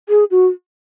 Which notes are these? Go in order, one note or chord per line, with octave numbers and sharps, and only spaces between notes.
G#4
F#4